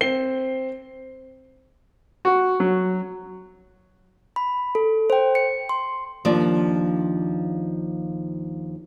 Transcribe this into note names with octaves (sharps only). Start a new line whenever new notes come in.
C4 C7 G7
F#4
F#3
B5
A4
C5 G5
C#7
C6
D#2 F3 D4 D5